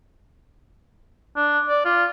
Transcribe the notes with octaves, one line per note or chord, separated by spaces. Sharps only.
D4
D5
F4